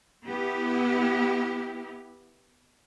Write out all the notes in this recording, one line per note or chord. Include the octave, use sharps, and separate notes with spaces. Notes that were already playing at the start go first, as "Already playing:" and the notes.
B3 E4 G4